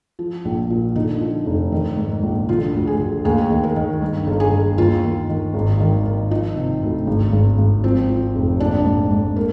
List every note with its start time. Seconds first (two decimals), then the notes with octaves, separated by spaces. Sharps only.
0.19 F3
0.45 A#1
0.70 A#2
0.96 D3 D#4
1.21 F3
1.46 F1
1.72 D#3
1.97 G#2
2.23 A#1
2.49 D3 F4
2.74 D2
2.87 G#4
3.00 D2
3.25 D#2 G#4
3.50 D#3
3.63 A#4
3.76 D#3
4.02 G2
4.27 G1
4.40 G#4
4.52 G1
4.77 D#2 F4
5.03 D#3
5.29 D#3
5.54 G#1
5.80 D#3
6.06 D#3
6.31 F3 D#4
6.56 C3
6.82 D2
7.07 G#1
7.33 G#1
7.58 G#1
7.84 F3 C4
8.09 F3
8.35 F1
8.60 A#1 D4
8.86 G#2
9.11 G#2
9.36 A#3